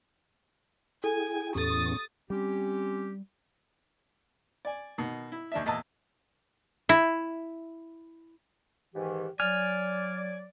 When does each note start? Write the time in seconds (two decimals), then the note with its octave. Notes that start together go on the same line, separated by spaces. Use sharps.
1.04 E4 G#4 A4 G5 G#5
1.55 E2 A2 C#4 G4 A4 C#6 D#6 A6
2.30 G3 C4 C#4 G4
4.65 D5 G#5
4.98 B2 D#3
5.32 E4
5.52 D#2 D4 E5
5.66 E2 A#2 D#5 A5 E6
6.89 E4
8.95 G#2 D#3 E3 G4
9.40 F#3 D5 G#5 F6